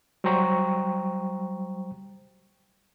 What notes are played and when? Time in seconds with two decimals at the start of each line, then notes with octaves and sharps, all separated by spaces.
0.24 F#3 G3 C5 G5 A#5 C#6